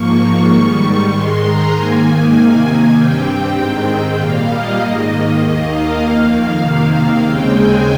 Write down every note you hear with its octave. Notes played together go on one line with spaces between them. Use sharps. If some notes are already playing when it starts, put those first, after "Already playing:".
Already playing: G#2 F3 A#3 C#6
G#2 D#3 G3
G#2 D#3 G#3 C6
A#5
G#2 D#3 A#3 G#5
C3 D#3 A#3
G2 G3 C4 G5
G5
G#2 D#3 G#3 C4
A#2 G3 A#3 F5
D#5
G#2 D#3 A#3
D#2 D#3 A#3 D#5
F5
F2 D#3 A#3
C3 D#3 A#3
D#2 C#3 G#3 C4 G5
G#5